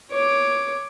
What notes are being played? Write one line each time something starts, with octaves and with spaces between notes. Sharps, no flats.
C#5 D6